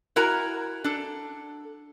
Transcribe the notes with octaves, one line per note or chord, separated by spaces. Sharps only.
E4 F#4 A#4 G#5 A#5
D4 A4